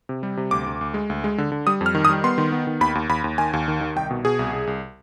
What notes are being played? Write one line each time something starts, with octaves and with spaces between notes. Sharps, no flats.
C3
G3
C3
D2 D6
D2
D2
G#3
D2
G#3
D3
D3
G3 D#6
F2
F6
D#3
D#6
G3
B3 C6
D#3
B3
D#3
D#2 B5
D#2
D#2 B5
D#2
D#3 G#5
D#2
D#3
D#3
C2 G5
B2
B2 G#4
C2
C2
C2